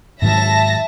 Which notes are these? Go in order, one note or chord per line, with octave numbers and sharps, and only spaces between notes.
G#2 D#3 F#3 E5 A5 A#6